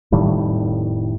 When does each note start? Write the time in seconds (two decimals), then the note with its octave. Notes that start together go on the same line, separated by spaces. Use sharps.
0.12 F1 A2 D#3 G3